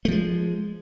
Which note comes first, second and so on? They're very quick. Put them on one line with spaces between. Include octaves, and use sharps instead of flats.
A3 F3 G#3